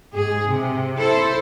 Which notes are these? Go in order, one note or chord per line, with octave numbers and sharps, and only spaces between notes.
G#2 G#4
C3
E4 A4 C5